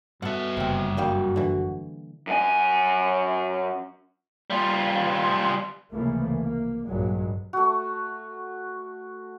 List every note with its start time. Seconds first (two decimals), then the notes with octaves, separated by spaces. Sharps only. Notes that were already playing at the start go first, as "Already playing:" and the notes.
0.22 G2 B2 A4 E5 F#5
0.57 F#1 C3 C4
0.97 G3 A#3 F#4 G4
1.36 D3 E3
2.27 F#2 G#5
4.50 G3 F4
5.92 C#2 C3 E3 F3 A3 A#3
6.38 A#3
6.86 A#1 G2 A#2 F#3 G#3
7.53 A3 F#4